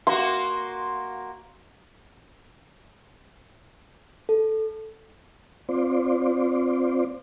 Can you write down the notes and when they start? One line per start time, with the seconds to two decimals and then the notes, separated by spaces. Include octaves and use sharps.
0.07 A#3 F#4 C6
4.29 A4
5.69 C4 F4 C5 D5